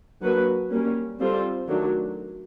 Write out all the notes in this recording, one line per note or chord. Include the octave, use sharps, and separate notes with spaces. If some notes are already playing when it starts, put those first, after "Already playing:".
F#3 A#3 D4 F#4 B4
G3 A#3 C#4
G3 C4 F4 A4 C5
D#3 F#3 A3 D4